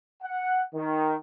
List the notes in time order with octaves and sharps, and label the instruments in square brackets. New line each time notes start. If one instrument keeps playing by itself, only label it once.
[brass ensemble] F#5
D#3